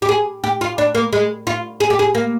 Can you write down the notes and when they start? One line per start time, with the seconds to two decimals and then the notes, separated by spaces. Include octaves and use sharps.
0.02 G4
0.09 G#4
0.44 G4
0.61 F4
0.78 D4
0.95 A#3
1.13 G#3
1.47 F4
1.80 G#4
1.90 G4
1.99 G#4
2.15 A#3